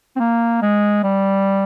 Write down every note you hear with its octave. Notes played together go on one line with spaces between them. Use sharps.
C4
A#3
G#3
G3